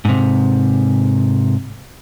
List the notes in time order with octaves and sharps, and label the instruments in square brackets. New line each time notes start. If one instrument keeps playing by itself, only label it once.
[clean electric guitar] G#2 C3